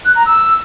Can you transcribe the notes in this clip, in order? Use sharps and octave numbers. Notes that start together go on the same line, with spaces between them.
F#6
A#5
E6